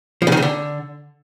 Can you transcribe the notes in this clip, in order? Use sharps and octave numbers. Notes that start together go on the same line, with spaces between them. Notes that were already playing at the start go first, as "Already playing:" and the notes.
F3
C#3
D#3
C#3
D3